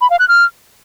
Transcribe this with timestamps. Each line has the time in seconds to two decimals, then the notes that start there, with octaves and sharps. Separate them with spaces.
0.01 B5
0.10 F5
0.19 F#6
0.28 F6